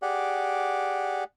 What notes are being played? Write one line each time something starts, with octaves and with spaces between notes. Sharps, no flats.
G4 G#4 D5 F#5